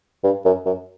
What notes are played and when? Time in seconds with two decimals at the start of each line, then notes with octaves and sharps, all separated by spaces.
0.24 G2
0.45 F#2
0.66 F#2